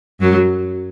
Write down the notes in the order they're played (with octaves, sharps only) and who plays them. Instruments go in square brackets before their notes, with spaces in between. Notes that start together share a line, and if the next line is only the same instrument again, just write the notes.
[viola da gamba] F#2 F#3